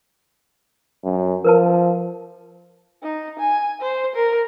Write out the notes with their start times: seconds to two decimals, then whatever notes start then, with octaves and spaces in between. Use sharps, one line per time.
1.04 F#2
1.45 F3 A#4 B4 A5
3.03 D#4
3.39 G#5
3.81 C5
4.15 A#4